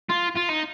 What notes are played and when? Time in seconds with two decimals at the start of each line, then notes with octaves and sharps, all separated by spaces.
0.09 F4
0.35 F4
0.49 D#4